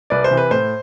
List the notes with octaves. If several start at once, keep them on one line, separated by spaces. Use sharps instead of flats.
C2 B4 D5
C5
C3 E3
B4
A2 C5